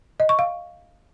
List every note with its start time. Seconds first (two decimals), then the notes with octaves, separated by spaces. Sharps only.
0.20 D#5
0.29 C#6
0.39 F5